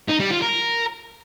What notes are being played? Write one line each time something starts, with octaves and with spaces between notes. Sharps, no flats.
D#4
G3
F4
A#4